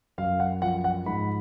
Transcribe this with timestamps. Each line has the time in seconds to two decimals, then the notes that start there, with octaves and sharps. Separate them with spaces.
0.18 F#2 F5
0.40 F#5
0.62 F3 F#5
0.84 F#5
1.06 G#2 B5